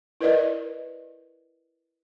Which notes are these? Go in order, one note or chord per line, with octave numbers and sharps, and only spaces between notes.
E4 A#4 B4 D5 D#5